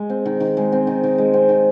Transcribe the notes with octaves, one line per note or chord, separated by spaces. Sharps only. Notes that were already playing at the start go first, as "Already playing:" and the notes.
Already playing: G#3
C4
D#3
D#3
G#3
C4
D#3
D#3
G#3
C4
D#3